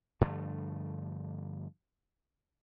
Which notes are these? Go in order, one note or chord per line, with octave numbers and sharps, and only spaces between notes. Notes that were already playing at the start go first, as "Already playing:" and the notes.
G2 D3 F3 A3